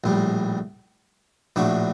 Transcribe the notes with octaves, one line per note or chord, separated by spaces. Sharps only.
A#1 A2 G3
A#1 A2 A3 D4 F#4